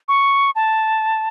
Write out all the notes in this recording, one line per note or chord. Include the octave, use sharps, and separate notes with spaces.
C#6
A5